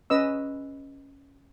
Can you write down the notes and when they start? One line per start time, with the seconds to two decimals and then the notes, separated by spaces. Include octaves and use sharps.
0.10 C#4 B4 D#5 E6